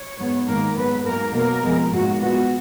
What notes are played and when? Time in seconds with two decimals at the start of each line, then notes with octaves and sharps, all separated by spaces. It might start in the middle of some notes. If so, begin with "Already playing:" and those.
Already playing: C#5
0.18 G#2 F#3 B3
0.47 G#2 D#3 A#3 A#4
0.76 G#2 F#3 B3 B4
1.04 G#2 F#3 A#3 A#4
1.33 B2 F#3 A#3 A#4
1.62 F2 F3 G#3 B3
1.91 G#2 F#3 A#3 F#4
2.19 A#2 G#3 B3 F#4